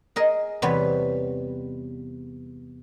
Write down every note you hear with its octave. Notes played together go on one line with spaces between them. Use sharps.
G#4 A#4 D#5
E2 C3 G3 B3 B4 C#5